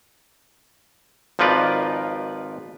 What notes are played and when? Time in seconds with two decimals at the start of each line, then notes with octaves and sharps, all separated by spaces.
1.39 G#1 F3 D#4 F4 B4 D5